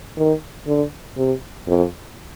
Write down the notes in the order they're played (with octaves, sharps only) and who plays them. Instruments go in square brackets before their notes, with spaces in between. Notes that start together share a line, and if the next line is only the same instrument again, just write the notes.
[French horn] D#3
D3
C3
F2